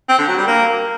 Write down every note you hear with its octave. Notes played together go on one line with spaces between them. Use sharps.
C4
D3
F#3
G3
A#3